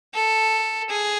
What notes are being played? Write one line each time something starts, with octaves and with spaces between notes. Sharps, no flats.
A4
G#4